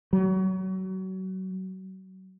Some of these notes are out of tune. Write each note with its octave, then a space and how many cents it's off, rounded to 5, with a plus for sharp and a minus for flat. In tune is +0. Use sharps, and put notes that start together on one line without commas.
F#3 +30